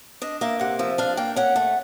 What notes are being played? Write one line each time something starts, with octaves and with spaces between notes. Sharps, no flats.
D4 D#5
A#3 E5
C3 F#5
F3 E5
D4 F5
A#3 G5
C#4 F#5
A3